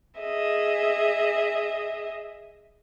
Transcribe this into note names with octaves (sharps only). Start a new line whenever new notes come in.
G#4 D#5 E5